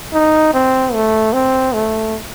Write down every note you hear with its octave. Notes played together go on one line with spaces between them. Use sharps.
D#4
C4
A3
C4
A3